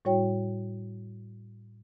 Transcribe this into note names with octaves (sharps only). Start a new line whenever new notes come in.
A2 G3 E4 F#4 C#5 G5